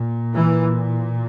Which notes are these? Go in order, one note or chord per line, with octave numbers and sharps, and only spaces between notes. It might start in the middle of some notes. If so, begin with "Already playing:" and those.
Already playing: A#2
E3